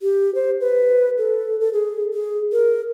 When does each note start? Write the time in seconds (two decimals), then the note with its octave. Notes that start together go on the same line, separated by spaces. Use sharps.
0.01 G4
0.35 C5
0.61 B4
1.18 A4
1.60 A4
1.73 G#4
2.14 G#4
2.52 A#4